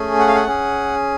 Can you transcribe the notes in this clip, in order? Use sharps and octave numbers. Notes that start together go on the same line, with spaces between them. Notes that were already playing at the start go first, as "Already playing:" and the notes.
Already playing: A3 C#4 G#4
F#5
F5
F#5
C#4 G#4